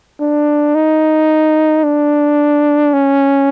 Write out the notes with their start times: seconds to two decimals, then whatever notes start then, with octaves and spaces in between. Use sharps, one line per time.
0.20 D4
0.75 D#4
1.83 D4
2.93 C#4